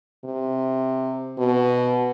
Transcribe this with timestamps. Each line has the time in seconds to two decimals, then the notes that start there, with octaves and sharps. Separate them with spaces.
0.25 C3
1.39 B2